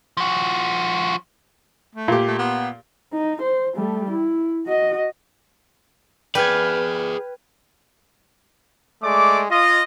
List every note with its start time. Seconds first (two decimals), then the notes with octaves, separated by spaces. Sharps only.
0.17 F3 F#4
1.95 A3
2.08 A#2 G4
2.27 A3
2.39 B3
3.13 D#4
3.42 C5
3.76 G3 A3
4.11 E4
4.66 F#4 D#5
6.35 G#4 B4 D5 G5 F6 G#6
9.03 G#3 A3 D5 D6
9.50 F4 D#5